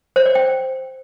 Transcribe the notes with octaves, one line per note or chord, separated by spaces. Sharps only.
C5
D5
G5